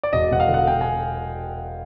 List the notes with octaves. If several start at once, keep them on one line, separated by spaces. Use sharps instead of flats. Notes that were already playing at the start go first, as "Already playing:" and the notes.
D5
E1 D#5
E1 F#5
F5
D3
F#5
E1 G5
G#5